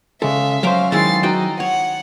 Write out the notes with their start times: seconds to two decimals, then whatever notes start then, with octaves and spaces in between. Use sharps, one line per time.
0.22 C#3 G#3 A4 E5 F5
0.63 F#3 C#4 C5 F5 A#5 D6
0.92 D#3 G#3 E4 A6 C7
1.23 D#4 F#4 D5 G5
1.60 C#5 F#5